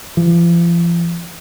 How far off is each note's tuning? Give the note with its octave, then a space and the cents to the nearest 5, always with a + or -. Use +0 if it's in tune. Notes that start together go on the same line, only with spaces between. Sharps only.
F3 -40